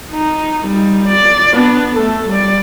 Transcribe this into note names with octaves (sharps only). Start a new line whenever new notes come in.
D#4
G3 D#4
D5
B3 D4
A3 A4
G3 D5